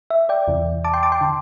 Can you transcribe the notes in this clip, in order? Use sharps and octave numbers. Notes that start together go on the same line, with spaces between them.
E5
D5 G5
E2 C3 E3
A5 D6
G5 C6
A5 D6
G5 C6
D3